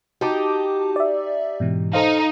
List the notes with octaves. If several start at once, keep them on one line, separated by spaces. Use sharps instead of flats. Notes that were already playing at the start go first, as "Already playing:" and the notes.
D#4 F#4 G4 A5 D6
D5 E5
G#2 B2 E3
D#4 A4 C5 F5